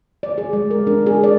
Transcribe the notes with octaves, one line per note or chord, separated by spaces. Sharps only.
D5
G#4
G#3
A#4
D4
G#4
D5